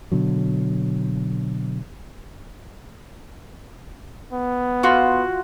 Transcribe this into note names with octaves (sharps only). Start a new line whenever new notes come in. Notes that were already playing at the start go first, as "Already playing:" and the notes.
B2 D3 F#3
B3
F4 F#4